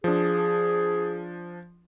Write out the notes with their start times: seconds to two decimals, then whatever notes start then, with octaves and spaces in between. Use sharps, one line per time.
0.04 F3 D4 G#4